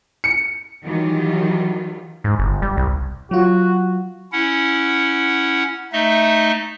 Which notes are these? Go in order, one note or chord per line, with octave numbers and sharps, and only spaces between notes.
C#7
D#3 E3 F#3 G3 F4
G#2
G1
G3
C2
F#3 F4 F#4
C#4 E4 F#5
A3 D#4 D#5 E5